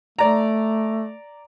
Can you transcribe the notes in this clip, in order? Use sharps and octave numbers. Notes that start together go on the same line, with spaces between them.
A3 D5 A#5